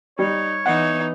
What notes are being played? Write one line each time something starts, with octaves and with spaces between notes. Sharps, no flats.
G3 D#4 C#5
E3 B3 D#4 F#5